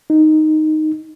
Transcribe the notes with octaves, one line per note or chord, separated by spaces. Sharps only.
D#4